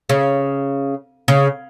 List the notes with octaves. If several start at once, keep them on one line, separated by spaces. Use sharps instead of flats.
C#3
C#3